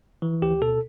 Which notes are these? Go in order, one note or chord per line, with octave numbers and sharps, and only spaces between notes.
E3
D2 G4
B2 A4